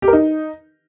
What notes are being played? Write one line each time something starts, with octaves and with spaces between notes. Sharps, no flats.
G4
A#4
D#4